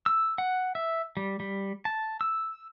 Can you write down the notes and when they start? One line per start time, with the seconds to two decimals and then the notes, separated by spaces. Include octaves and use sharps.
0.06 E6
0.38 F#5
0.75 E5
1.17 G3
1.40 G3
1.85 A5
2.21 E6